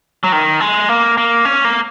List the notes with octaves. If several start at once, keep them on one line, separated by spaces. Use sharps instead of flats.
F#3
D#3
G#3
A#3
A#3
C#4
A#3